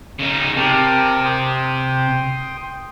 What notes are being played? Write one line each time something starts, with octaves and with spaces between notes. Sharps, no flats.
C#3 D#4
C3 G4 A#4 A5
G5 C6 D#6